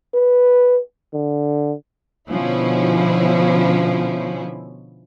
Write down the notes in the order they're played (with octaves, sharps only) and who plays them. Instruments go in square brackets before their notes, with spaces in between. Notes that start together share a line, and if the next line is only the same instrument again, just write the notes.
[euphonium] B4
D3
[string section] B2 D3 F3 C#4 E4